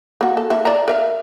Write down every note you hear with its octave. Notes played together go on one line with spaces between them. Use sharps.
A#3 F#4
A4
A#3 E4 E5
D5 E5 A#5
A#4 E5 F5